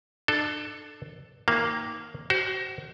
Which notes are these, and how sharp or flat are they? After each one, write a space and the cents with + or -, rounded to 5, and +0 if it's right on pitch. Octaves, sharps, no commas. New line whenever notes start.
D4 +35 A4 +0
D#3 +15 A#3 +0 F5 -45
F#4 +30 C5 +0